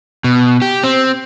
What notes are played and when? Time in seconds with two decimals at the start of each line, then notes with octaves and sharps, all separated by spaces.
0.24 B2
0.62 G4
0.84 C4